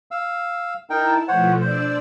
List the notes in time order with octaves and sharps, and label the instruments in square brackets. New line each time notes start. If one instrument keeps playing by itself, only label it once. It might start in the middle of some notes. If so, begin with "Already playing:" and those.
[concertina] F5 E6
[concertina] D#4 A#4 G5 [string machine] E4 A5
[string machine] B2 F3 A3 [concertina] C5 C#5 F#5
[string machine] D4 D5 E6 [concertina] C5